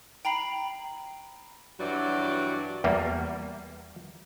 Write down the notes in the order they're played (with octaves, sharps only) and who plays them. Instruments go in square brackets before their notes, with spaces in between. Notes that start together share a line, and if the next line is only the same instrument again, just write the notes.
[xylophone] G5 A#5 B5 C7 F#7
[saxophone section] G2 E3 F#3 F#4 D5
[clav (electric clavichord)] E2 G3 A#3